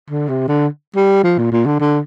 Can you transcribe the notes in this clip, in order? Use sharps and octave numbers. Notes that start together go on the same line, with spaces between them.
D3
C3
D3
G3
F3
A#2
A#2
D3
D3